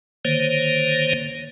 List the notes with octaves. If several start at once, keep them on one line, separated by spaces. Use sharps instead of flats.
D3 D#3 A#3 C5 C#5